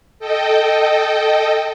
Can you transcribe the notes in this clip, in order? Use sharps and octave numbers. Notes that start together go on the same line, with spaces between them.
A4 D#5 G5